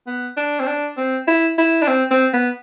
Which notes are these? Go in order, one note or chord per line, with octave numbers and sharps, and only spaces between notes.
B3
D4
C4
D4
C4
E4
E4
D4
C4
C4
B3